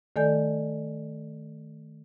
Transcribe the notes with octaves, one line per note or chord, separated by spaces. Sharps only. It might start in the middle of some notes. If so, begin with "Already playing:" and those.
D#3 A3 A4 D5 G#5 G6